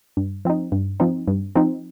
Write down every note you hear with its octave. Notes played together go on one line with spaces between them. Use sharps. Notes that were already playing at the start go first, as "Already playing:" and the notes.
G2
F3 C4 D#4
G2
F3 C4 D#4
G2
F3 C4 D#4